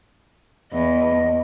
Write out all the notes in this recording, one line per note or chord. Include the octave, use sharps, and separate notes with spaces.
E2 D#5